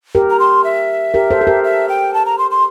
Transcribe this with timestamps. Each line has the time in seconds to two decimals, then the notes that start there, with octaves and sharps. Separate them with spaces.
0.15 G4 A#4
0.30 A#5
0.39 C6
0.64 E5
1.14 G4 A#4
1.31 A4 C5
1.41 A4
1.47 G4 A#4
1.64 E5
1.89 G5
2.14 A5
2.26 A#5
2.38 C6
2.51 C6